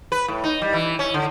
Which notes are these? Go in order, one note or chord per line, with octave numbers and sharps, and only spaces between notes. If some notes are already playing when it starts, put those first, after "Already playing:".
B4
A2
D#4
G3
E3
C#4
D3